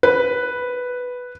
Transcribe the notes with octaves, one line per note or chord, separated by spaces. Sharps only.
B4